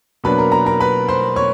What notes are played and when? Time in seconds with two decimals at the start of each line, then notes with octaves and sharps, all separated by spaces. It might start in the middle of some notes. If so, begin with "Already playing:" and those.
0.24 B2 F#3 A#3 D4 B4 B5
0.38 A#4 A#5
0.52 A#4 A#5
0.66 A#4 A#5
0.80 B4 B5
1.08 C5 C6
1.36 C#5 C#6